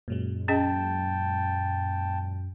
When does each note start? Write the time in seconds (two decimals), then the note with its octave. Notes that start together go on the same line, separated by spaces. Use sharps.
0.08 F#2 A#2 F#3 G#3
0.48 C#4 G#4 D#5 G5 A5